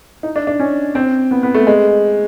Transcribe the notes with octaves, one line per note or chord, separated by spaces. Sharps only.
D#4
D4
D4
C#4
C4
B3
B3
A3
G#3